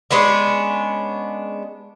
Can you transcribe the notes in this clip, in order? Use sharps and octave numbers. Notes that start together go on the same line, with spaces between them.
G#3 B3 C#4 D4